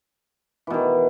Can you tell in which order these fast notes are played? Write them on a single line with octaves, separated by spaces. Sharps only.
E3 B2 D#3